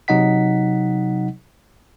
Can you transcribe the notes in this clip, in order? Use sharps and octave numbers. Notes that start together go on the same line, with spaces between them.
C3 F#3 D#4 D#5 F#5 B6